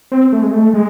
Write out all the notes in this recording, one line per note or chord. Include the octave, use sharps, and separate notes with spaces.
C4
A3
G#3
A3
G#3